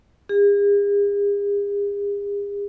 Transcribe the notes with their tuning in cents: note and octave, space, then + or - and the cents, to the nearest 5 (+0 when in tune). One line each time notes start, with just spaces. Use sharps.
G#4 -45